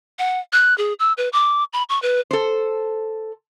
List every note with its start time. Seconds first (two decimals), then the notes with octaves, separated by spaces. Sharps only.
0.19 F#5
0.53 F#6
0.78 G#4
0.99 E6
1.18 B4
1.33 D6
1.73 B5
1.89 C#6
2.02 B4
2.31 A4 C5